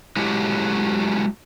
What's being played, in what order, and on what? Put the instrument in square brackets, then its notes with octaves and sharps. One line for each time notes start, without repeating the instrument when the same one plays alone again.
[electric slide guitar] F#3 G#3 A3 C#4 E4 G4